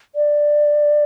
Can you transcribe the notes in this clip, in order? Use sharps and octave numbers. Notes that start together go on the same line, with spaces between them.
D5